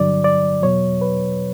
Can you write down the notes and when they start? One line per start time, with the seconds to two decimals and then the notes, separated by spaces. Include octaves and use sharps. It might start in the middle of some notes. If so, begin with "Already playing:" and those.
Already playing: G2 D3 F#3 D5
0.24 D5
0.62 E2 B2 F#3 C#5
1.01 B4